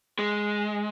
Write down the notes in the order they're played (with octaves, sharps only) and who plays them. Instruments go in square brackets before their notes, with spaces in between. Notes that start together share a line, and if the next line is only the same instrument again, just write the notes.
[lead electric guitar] G#3